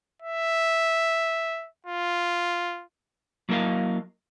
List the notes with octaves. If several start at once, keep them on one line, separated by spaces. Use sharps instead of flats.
E5
F4
F#3 A#3 E4 A#4 D#5 F5